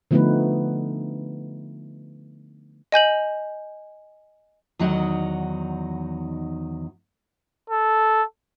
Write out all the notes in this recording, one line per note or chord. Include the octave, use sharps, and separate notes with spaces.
D3 F3 A3 B3 D#4 B4
D#5 G#5 G6 F#7
E2 D#3 F#3 D#4 F#5
A4